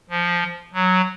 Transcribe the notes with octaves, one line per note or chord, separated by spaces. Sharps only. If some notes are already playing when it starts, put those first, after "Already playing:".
F3
F#3